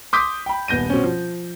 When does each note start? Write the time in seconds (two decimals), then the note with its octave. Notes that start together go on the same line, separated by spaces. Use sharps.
0.13 C6 D6 D#6 G6 B6
0.46 G5 B5
0.68 D#1 B3 G6 A#6 D#7
0.90 B2 C4 C#4
1.04 F3